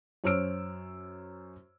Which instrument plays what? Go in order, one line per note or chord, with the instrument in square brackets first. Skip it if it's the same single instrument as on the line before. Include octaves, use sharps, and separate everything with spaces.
[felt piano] F#2 C5 C#5 E6 F6 D7